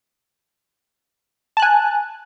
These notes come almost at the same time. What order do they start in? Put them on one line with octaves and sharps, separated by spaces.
A5 F#6 G#5